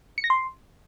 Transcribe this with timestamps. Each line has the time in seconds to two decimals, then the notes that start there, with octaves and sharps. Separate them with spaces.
0.18 C#7
0.24 A#6
0.30 C6